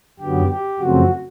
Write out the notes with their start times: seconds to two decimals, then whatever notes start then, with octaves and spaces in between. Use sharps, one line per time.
0.19 F#2 D3 F#3 B3 G4
0.49 G4
0.79 F#2 C#3 F3 A3 C4 F#4